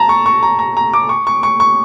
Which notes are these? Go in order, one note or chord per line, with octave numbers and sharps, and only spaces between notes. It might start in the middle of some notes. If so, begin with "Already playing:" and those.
Already playing: A5 A#5
C#6
C#6
A#5
A#5
A#5
D6
C#6
C#6
C#6
C#6